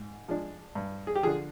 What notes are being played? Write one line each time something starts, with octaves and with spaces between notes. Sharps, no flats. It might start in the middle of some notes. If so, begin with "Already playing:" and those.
Already playing: G#2
F3 G#3 D4
G2
G#4
G4
D3 F3 G#4